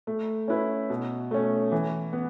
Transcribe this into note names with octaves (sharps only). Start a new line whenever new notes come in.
A3
C#4 E4 B4
B2
A3 C#4
E3
B3